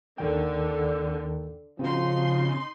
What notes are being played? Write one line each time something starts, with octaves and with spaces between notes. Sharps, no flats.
D#2 D3 D#3 G5
C#3 F3 C4 D#4 F#4 C6